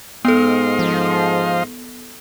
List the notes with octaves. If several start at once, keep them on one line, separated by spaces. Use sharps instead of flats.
G#2 B3 A4 D#5 F5 C6
F3